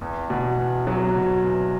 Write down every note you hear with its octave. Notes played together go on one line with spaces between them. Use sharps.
E2
B2
E2
F#3
B2
E2